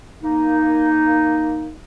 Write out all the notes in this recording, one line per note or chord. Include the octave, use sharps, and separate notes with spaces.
A#3 D#4